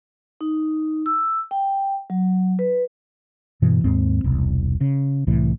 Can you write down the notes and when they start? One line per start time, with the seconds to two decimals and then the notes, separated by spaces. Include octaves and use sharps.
0.41 D#4
1.06 E6
1.51 G5
2.10 F#3
2.59 B4
3.62 G2 B2 E3
3.84 D#2 G#2 C4
4.24 E1 C2
4.81 C#3
5.27 C2 A2 E3